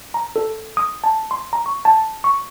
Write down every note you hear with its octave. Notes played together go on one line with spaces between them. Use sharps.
A#5
A4
D#6
A5
C6
A#5
C#6
A5
C#6